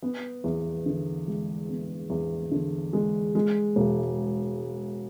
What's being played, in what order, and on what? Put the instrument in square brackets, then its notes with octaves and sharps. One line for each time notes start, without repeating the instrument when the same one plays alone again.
[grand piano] B3
E2
D3
G#3
B3
E2
D3
G#3
G#3
E1